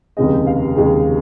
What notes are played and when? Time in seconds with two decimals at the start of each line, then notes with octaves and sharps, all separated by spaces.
0.17 F1 D#2 C#3 G#3 D#5
0.47 F5
0.76 F1 D#2 C#3 G#3